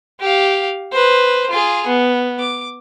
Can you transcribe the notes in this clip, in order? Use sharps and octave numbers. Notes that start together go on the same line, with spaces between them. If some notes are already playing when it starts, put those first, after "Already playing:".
G4 F5
B4 C5
F4 G#4
B3
D6